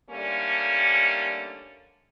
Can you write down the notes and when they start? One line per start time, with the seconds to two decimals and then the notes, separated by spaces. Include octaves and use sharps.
0.10 D3 D#3 G3 A3 A#3 C#4